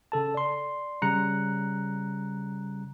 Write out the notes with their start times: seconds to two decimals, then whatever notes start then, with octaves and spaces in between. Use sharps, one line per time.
0.12 C#3 A4 A5
0.34 D5 C6
1.02 C#3 G3 A#5 F#6 C#7